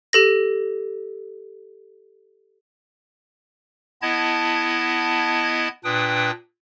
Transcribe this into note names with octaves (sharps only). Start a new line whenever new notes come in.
G4 A4 A#6
B3 E4 D#5 A5 G#6
A#2 D4 B4 G5 D#6